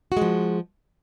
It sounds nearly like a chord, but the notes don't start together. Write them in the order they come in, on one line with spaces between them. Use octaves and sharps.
F#4 G#3 F3